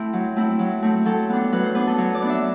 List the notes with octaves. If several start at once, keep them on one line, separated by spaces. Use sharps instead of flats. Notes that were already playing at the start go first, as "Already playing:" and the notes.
Already playing: A3 C4 E4
F#3
A3 C4 E4
F#3
A3 C4 E4
F#3 A4
B3 D4
F#3 B4
C5
B3 D4 B4
A4
F#3
D5
B3 D4
E5